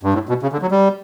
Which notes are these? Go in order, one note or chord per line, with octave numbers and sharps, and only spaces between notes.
G2
A2
B2
C#3
D3
F#3
G3